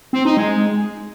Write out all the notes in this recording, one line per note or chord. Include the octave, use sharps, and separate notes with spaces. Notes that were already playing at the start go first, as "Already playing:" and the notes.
C4
D#4
G#3